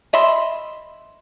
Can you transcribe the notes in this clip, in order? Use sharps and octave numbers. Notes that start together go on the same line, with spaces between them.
D#5 E5 B5 C6